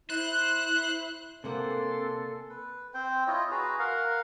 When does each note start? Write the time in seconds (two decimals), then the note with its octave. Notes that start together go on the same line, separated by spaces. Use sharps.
0.10 E4 C5 F#6
1.44 C3 A#3 D4 A4 C5 F#5 G#5 C6
2.50 B4
2.94 C4 C5 G5
3.27 E4 F4 C#5 D#5
3.51 F#4 G#4 B4 A#5
3.79 A#4 F5 F#5